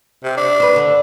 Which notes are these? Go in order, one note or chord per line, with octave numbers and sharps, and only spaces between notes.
C3
D4
B4 C5
D3